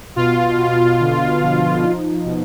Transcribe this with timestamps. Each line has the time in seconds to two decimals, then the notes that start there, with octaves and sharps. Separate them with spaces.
0.16 B2 F4
0.58 B2
1.00 D3
1.42 F3
1.83 D#4
2.26 B2